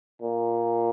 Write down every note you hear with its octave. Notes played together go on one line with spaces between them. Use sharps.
A#2